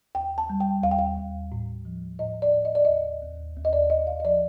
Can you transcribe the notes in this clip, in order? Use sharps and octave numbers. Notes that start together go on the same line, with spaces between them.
D#2 G5
A5
G3
G5
D#2 F5
G5
F5
D#2
A2
F3
A2 D#5
D5
A2
D#5
D5
D#2 D#5
D#2
D#2
D#5
D5
D#2 D#5
F5
D#5
F3 D5